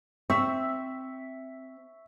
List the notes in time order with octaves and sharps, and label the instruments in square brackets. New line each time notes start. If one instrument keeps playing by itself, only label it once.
[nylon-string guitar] C4 [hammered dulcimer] E5 [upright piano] C#6